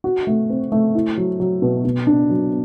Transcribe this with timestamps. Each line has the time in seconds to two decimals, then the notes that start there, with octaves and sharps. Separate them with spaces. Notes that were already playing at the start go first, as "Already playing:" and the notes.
0.04 F#4
0.27 A3
0.49 C4
0.72 A3
0.95 E4
1.17 F#3
1.40 F#3
1.62 B2
1.85 B2
2.07 D4
2.29 F#3